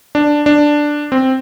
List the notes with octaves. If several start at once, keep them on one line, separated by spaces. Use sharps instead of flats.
D4
D4
C4